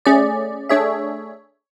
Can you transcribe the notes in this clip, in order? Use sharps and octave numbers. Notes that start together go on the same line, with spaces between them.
A3 C#4 G#4 D5
A3 D4 G#4 C#5 E5